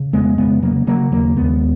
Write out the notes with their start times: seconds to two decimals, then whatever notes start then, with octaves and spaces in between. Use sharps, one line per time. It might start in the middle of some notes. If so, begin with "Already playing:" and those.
Already playing: C#3
0.13 F2 G#3 B3
0.38 C#3 G#3 B3
0.62 C#3 F#3 A#3
0.87 C#3 F#3 A#3
1.11 D#2 F#3 A#3
1.36 D#2 G#3 B3